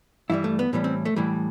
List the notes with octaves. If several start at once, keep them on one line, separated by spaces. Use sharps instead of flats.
G2 E3 G3 E4
A3
B3
A2 E3 G3 B3
C4
A3
A2 E3 G3